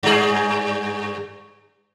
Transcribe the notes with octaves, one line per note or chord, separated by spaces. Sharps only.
G2 G#4